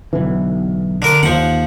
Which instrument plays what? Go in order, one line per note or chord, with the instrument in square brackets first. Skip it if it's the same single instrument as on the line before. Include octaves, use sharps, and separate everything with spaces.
[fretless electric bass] B1 D3 E3
[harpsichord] D3 A#4 D6
[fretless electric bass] D#2 [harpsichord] F3 F#5